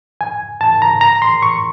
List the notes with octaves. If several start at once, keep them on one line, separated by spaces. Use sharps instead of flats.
G#5
A5
A#5
A#5
C6
C#6